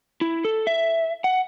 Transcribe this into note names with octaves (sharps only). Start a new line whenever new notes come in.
E4
A4
E5
F#5